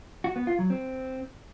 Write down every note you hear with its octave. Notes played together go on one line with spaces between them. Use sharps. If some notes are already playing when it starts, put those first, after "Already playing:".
F#4
B3
F4
F#3
C4